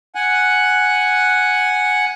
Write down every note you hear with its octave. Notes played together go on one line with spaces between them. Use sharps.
F#5 G#5 F#6